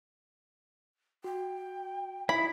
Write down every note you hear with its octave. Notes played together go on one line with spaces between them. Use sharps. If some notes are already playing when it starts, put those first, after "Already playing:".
F#4 G5
D#4 E4 B5